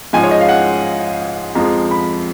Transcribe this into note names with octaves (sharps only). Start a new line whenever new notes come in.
G#2 F3 G#3 G#5
C#5
D#5
F5
F#5
F2 F3 G#3 A#5
B5